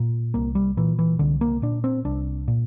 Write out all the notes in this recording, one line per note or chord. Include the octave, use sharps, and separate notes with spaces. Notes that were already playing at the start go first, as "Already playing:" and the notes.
Already playing: A#2
C2 A#3
G3
A#2 E3
E3
C2 D3
A#3
A#2 D4
C4
C2 D4
A#2